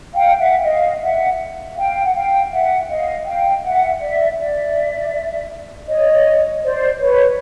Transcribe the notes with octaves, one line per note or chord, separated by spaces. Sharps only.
F5 G5
E5 F#5
D#5 F5
E5 F#5
F5 G5
F#5
F5 G5
E5 F#5
D#5 F5
F5 G5
E5 F#5
D5 E5
D5 E5
C#5 D#5
C5 D5
B4 C#5